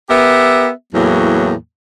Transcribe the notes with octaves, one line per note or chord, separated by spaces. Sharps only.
B3 G4 A#4 E5
E2 A2 F#3 A#3